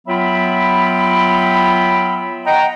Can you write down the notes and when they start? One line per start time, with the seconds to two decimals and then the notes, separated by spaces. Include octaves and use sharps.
0.08 F#3 B3 F4 E5 G5 B5
2.46 D#5 F#5 G5 A#5